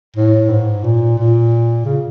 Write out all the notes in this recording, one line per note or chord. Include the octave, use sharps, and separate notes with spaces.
A2
G#2
A#2
A#2
C#3